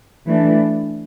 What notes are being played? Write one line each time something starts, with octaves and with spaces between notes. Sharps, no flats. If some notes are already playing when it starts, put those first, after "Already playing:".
E3 A3 D4